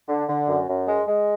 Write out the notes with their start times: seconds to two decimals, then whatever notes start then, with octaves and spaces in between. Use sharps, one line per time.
0.08 D3
0.29 D3
0.48 F#2
0.68 F#2
0.87 G#3
1.08 G#3